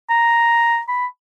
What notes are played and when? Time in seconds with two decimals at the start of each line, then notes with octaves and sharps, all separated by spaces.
0.10 A#5
0.88 B5